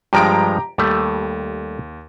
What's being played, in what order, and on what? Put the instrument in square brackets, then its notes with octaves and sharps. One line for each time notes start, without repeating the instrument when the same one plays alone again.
[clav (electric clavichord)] G2 F3 G#3 [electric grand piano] G4 A#5 D7
[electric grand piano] D#2 [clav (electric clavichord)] G3 A3